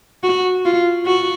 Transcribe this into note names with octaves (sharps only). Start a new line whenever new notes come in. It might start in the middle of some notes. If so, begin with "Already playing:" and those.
F#4
F4
F#4